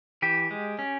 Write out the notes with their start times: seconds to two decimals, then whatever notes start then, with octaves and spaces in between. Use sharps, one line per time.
0.22 E3 G4
0.51 G#3
0.79 C#4